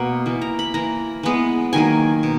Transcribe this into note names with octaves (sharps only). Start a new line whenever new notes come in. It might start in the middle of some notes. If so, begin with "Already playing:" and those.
Already playing: B2 A#3 F#5
E3 A#3
A#5
B5
E3 A#3 A#5
E3 G#3 B3
D#3 F#3 A#3 G#5
B2